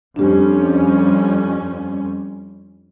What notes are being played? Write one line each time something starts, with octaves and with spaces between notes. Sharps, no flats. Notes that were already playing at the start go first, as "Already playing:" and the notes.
F2 G3 C#4 D4 G4